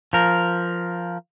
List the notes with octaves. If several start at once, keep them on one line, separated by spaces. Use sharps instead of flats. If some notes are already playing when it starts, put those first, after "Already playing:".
F3 A#4